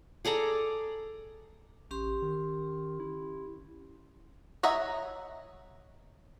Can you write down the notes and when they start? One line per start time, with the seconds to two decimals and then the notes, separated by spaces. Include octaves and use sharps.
0.25 G#4 A4 D5 A#5
1.91 A1 C#4 G4 C6
2.22 D#3
3.00 E4
4.63 C#5 D#5 E5 F#5 A#5